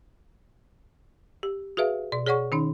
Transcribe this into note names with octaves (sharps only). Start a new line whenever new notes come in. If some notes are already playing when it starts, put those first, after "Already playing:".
G4
F#4 G#4 B4 E5 F5
B2 D5
G#4 C#5 D5 F#5 C#6
D#3 C#4 D#4